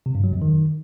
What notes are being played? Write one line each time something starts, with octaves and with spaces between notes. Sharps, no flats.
C3
G2
F#3
F2
D#3